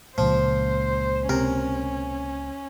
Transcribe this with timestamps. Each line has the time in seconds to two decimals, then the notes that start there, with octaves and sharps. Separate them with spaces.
0.18 C#2 A#2 F3 C5
1.29 C3 C#4 A#4